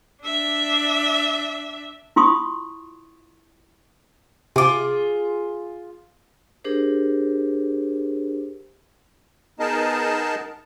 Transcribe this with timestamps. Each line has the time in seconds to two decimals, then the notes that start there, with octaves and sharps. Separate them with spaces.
0.23 D4 E5
2.16 E4 F4 C6 C#6 D#6
4.56 C3 F4 G#4 D6
6.64 D4 G4 G#4 A#4 C5
9.59 B3 D#4 G#4 A#4 D#5 A5